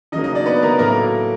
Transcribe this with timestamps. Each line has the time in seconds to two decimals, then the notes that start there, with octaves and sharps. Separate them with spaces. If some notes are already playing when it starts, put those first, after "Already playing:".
0.12 C#3 F#3 A#3 D#4 D#5
0.24 D#4 D#5
0.35 D4 D5
0.46 B3 B4
0.62 A#3 A#4
0.79 A2 F#3 A3 A#3 A#4